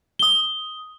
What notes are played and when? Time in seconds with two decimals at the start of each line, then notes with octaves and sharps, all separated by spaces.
0.19 D#6 G7